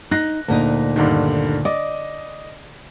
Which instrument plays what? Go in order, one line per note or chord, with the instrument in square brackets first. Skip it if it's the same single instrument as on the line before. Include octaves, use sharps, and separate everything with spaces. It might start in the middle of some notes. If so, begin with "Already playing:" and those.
[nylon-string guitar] D#4 [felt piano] F#6 A#6
[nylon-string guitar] D2 A#2 D#4
[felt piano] G2 D3 D#3
[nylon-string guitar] D5 [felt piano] D#5